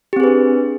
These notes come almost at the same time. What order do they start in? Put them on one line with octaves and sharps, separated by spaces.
G4 C4 G#4 B4 D4